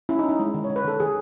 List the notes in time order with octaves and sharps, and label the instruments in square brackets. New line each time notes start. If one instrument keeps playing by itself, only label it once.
[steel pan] C#4 E4
D#4
C#4
D#4
G#3 E4
D#3
C#5
D#3
B4
D#3 A4
D#3 G#4